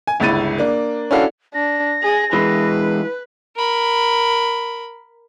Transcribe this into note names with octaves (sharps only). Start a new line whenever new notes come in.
G#5
G1 C#2 E4 A6 D#7
A#3 D4
C#4 D4 E4 F#4 A4 F5
D4 A#6
G#4
E3 G#3 B4
A#4 B5